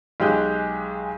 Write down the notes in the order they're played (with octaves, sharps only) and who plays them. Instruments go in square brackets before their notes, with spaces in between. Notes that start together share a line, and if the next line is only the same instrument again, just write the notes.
[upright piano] B1 G#3 G4 G#4 F#6 G6